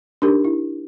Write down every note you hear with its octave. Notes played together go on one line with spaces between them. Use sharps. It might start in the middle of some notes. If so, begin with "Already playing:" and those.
D4 D#4 G4 A#4
E4